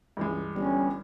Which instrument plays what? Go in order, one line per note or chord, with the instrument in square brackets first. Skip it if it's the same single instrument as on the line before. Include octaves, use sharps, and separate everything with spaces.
[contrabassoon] C#2 [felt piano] G2 E3 G#3
[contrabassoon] G1 [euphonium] G3 [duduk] C#4